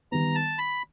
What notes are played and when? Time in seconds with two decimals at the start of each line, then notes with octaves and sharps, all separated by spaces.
0.12 D#3 G3 B3 A#5
0.35 A5
0.58 B5